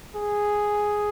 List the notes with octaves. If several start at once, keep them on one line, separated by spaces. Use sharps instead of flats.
G#4